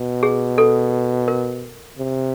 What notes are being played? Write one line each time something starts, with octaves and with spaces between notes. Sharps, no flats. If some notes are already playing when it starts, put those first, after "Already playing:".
Already playing: B2
G#4
A4
A#4
C3